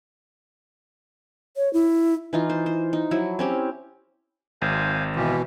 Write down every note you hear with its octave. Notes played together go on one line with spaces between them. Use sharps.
C#5
E4
E3 D#4 F4
C5
C5
D#4
F3 F#3 E4
C4 C#4 G4
G#1 C5 F5 G#5
B2 E3 F4 G4